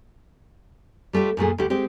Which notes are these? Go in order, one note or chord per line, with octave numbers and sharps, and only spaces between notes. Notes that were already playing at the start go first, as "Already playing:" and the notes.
G3 A3 F4 G4
F#2 A#2 A3 G#4
D2 A3 G4
G#3 C4 G4